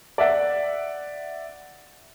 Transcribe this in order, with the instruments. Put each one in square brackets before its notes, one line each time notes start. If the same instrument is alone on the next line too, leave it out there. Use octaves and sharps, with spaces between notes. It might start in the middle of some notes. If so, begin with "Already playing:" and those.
[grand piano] D5 E5 F#5